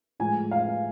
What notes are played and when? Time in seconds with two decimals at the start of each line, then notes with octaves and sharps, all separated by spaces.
0.20 A2 F3 G#3 G#5
0.51 F5